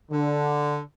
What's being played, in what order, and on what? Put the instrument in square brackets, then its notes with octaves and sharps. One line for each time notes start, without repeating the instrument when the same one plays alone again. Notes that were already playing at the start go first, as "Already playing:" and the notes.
[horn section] D3